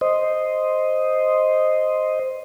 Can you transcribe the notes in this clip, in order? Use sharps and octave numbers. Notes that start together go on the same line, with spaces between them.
C5 D#5